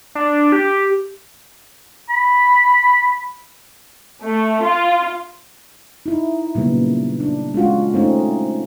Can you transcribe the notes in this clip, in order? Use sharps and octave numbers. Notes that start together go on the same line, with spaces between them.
D4
G4
B5
A3
F4
D#4 E4
A#2 C#3 F#3 G3 B3
D4
G#3 C#4 F4 F#4
A3 C4 C#4 D#4